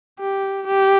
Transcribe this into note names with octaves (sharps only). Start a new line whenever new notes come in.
G4
G4